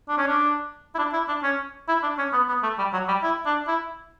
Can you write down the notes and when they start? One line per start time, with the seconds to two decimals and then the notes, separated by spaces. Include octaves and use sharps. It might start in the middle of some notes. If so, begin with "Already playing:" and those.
0.09 D4
0.18 C#4
0.28 D4
0.94 E4
0.98 D4
1.13 E4
1.28 D4
1.43 C#4
1.88 E4
2.03 D4
2.18 C#4
2.32 B3
2.48 B3
2.63 A3
2.78 G3
2.93 F#3
3.08 G3
3.23 E4
3.46 D4
3.67 E4